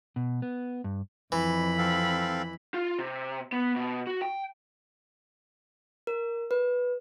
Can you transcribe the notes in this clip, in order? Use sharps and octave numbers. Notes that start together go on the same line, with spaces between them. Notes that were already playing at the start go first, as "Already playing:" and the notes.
B2
B3
G2
F2 E3 B5
C4 A4 F5
F4
C3
B3
B2
F#4
G5
A#4
B4